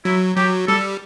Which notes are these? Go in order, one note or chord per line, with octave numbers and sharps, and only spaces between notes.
F#3 E4
F#3 G4
G3 A4